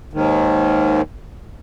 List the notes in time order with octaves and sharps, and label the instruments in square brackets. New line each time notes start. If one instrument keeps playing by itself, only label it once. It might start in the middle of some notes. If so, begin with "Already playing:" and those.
[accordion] D#2 G#2 D#3